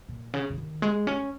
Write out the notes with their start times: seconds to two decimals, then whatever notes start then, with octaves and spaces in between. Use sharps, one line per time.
0.09 A#2
0.34 C#3
0.50 C#3
0.58 D#3
0.82 G#3
1.07 C#4